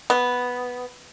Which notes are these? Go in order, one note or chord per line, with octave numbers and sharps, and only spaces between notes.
B3